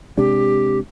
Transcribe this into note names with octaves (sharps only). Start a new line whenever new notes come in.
C3 G#3 D4 G4